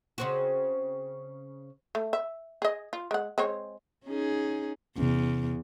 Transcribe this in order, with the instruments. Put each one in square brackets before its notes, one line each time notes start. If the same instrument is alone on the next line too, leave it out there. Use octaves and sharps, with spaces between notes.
[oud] C#3 C4 F#4
[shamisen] A3
E5
G#4 D#5
F4
G#3 F#5
G#3 C4 C#5
[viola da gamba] C#4 D#4 G#4
[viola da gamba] E2 [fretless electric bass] C3 C#4